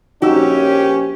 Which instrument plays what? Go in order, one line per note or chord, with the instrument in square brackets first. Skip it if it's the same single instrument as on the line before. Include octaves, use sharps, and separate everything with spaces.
[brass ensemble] A#1 C#4 [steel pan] D#4 F#4 E6 [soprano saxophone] G4